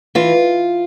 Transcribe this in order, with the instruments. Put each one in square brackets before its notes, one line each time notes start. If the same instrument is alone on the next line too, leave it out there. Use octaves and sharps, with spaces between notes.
[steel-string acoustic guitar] E3 F4